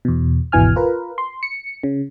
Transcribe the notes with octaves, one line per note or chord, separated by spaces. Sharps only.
E2 B2
G#1 E2 B2 E3 G#5 F6
F4 A#4 B4
C6
C#7
C#3